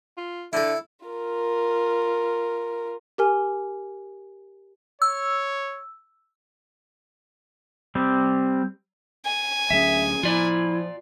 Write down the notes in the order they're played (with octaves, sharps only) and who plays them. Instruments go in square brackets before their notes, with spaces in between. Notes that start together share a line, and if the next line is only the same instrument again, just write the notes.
[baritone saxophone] F4
[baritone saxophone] D3 [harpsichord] E4 A4 [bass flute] E5
[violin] F4 A#4
[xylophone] G4 A#4 G#5
[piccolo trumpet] C#5 [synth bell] E6
[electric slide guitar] G3 C4
[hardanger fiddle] G#5
[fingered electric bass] D2 F#3 C#4 [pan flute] G#4 [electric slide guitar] E5
[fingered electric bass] F3 [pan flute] E4 [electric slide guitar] F4 D5